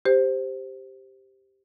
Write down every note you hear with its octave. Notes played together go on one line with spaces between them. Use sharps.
G4 C5